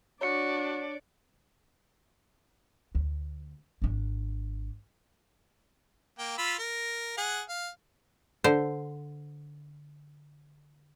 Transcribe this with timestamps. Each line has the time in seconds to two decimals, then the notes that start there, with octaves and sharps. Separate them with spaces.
0.21 D4 F#4 C#5 D5 C#7
2.95 D2
3.82 G#1 D4
6.18 A#3 G5
6.38 F4 B5 E6
6.58 A#4
7.17 G#4 F#5
7.49 F5
8.44 D3 C5